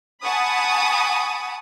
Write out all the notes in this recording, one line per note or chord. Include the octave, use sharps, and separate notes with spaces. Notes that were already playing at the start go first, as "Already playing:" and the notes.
F#5 G#5 A5 B5 C#6 D#6